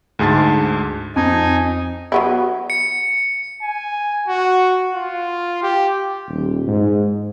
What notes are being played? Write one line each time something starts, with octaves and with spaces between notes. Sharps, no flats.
D2 G#2 G#4 A5 A6
F2 D#4 G#5
F#3 B3 E4
C#7
G#5
F#4
F4
G4
D#1
G#2